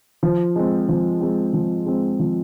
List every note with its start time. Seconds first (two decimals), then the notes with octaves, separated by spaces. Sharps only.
0.23 F3
0.56 G#3 C4
0.89 F3
1.21 G#3 C4
1.53 F3
1.86 G#3 C4
2.19 F3